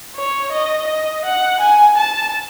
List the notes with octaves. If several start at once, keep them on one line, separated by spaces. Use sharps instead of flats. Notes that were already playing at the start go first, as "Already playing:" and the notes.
C#5
D#5
D#5
F#5
G#5
A5